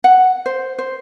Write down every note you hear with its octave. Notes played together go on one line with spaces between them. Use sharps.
F#5
C5
C5